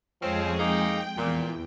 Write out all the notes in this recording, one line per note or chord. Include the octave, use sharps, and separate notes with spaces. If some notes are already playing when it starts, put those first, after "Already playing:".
F2 F3 G#3 C4 C#4 G#4
G#3 A#3 D#4 G5
E2 A#2